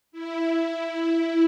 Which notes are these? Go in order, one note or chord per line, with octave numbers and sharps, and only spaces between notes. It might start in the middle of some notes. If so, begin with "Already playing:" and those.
E4